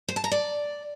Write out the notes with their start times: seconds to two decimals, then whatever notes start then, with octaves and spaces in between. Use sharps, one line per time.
0.08 C5
0.16 A5
0.24 A#5
0.32 D5